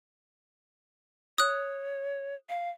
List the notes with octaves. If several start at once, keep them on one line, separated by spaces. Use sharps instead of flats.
C#5 D#6 F#6
F5